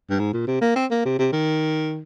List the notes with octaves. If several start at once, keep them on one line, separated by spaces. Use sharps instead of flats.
G2
G#2
A#2
C3
A#3
C4
A#3
C3
C3
D#3